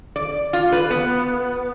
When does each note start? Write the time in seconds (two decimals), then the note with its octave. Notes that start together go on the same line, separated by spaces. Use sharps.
0.16 D5
0.53 F4
0.72 B4
0.91 B3